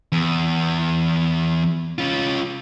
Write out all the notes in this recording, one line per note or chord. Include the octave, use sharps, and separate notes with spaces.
E2
C#4 F4